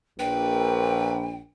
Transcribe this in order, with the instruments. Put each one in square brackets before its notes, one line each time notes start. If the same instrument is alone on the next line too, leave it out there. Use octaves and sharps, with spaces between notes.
[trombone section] A#1 [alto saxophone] B4 [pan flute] G5